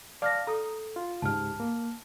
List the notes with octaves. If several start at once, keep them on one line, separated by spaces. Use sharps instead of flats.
D5 F5 A5 D6 F6 A#6
A4 A#5 D#6
F4
C#2 G#2 G4 A5 F6
A#3